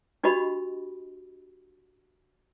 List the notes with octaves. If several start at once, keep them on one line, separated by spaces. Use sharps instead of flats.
D4 F#4 G4 D#5 B5